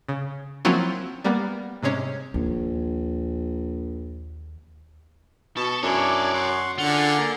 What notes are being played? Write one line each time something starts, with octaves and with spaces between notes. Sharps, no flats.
C#3
F3 F#3 A#3 C4 C#4 E4
G3 A#3 B3
G#2 C3 G#3 C#4
A#1 D#2
B2 A4 C#6
F#2 D4 E4 G#4 C#5 D5
F#5 C6 C#6
D3 F4 F#5
G#4 D5
A#3